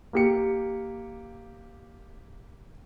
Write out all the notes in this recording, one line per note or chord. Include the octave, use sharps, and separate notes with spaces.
A#3 G4 C#7